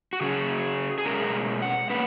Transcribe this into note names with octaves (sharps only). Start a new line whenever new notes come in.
F#4
C#3 F#3 C#4 G#4
G#4
B2 G#3 C#4 A#4
F#5
A#3 C#4 B4